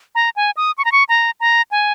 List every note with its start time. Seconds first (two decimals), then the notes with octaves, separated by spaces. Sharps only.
0.15 A#5
0.36 G#5
0.57 D#6
0.78 C#6
0.85 A#5
0.92 C#6
1.09 A#5
1.40 A#5
1.71 G#5